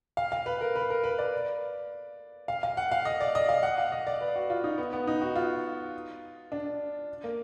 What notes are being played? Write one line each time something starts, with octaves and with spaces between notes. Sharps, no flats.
F5
F5
B4
A#4
B4
A#4
B4
D5
F5
F5
F#5
F5
D#5
D5
D#5
F5
F#5
F5
D#5
D5
B4
F#4
F4
D#4
B3
B3
D#4
F#4
F4
D4
A#3